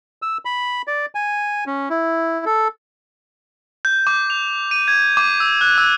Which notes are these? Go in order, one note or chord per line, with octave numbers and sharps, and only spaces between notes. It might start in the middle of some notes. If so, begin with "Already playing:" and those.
E6
B5
D5
G#5
C#4
E4
A4
G6
D6
F7
D#7
G#6
D6
E6
F#6
E6